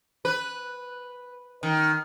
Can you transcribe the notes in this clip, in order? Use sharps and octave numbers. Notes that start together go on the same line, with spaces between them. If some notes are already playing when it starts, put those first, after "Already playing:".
B4
D#3